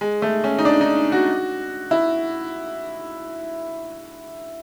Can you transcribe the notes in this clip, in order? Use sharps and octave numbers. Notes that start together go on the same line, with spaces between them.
G#3
A3
C#4
D#4
D4
D#4
F#4
E4